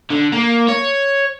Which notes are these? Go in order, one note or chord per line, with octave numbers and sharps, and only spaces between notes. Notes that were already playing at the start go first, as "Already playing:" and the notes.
D3
A#3
C#5